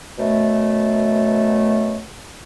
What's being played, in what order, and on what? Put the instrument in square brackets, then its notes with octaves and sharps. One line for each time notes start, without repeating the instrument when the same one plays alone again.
[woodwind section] F#2 B2 A3